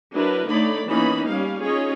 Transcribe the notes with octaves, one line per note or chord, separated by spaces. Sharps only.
F#3 D4 E4 A#4 B4
D3 A3 D#4 C#5 D5 B5
E3 A#3 B3 C#4 D#4 B5
G3 C#4 F5
C#4 D#4 F4 G#4 C#5 D#5